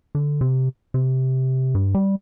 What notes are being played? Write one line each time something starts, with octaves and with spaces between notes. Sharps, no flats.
D3
C3
C3
G2
G3